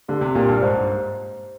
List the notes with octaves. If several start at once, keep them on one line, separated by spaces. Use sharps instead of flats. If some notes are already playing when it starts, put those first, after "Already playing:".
D3 G4
C3
A#2 G4
G2
G#2 C5